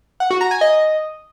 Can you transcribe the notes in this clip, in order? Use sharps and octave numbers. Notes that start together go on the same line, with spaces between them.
F#5
F#4
A#5
G#5
D#5